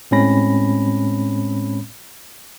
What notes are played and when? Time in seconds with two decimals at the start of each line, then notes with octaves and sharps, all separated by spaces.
0.11 A2 G#3 C4 C#4 B5 A#6